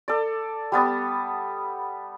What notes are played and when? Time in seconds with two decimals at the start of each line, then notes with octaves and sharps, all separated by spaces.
0.08 A4 D5
0.72 G3 B3 A5 D#6